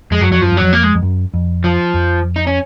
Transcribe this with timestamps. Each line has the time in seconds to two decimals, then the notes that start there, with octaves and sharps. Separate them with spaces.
0.11 F2 G#3
0.21 F#2 F#3
0.31 F2 F#3
0.42 F#2 F3
0.52 F#2
0.57 F2 F#3
0.73 A#3
0.83 G#3
0.95 F2
1.02 F#2
1.34 F2
1.64 F3
1.94 F2
2.36 D#4
2.47 C#4